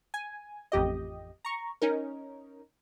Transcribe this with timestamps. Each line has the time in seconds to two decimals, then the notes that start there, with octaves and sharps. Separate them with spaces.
0.14 G#5
0.72 A1 F2 G4 D#5
1.45 A#5 C#6
1.82 C#4 D#4 A#4